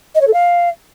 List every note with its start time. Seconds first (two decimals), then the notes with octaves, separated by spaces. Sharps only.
0.15 D#5
0.21 C#5
0.27 A4
0.34 F5